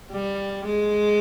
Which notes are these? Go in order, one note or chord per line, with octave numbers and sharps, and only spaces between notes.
G3
G#3